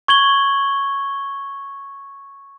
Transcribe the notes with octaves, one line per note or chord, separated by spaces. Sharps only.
C#6 G#6 F#7 G7